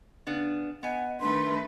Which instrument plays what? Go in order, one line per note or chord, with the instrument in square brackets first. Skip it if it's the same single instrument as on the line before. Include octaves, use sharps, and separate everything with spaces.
[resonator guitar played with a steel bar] C#3 B3 D4
[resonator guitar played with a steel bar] B3 G#5 [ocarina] D#5 [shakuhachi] F#5
[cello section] D#3 A3 B4 [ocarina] D4 [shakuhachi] C6